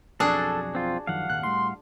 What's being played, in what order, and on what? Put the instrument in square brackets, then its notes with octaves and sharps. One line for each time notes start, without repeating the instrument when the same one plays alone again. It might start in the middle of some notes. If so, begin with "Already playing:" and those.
[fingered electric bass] B1 F2 [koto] D4 F#4 G#4 [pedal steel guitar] A4
[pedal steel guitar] C4 F4
[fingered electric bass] F#2 D#3 F3 [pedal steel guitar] F5 F#5
[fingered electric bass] G#1 D#2 A#2 [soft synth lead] F#6
[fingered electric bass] A2 G3 [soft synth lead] C6